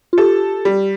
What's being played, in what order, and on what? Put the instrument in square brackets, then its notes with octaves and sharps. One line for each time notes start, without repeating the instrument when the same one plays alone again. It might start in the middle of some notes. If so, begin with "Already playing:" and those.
[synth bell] F4
[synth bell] G4 [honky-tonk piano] A4
[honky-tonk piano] G3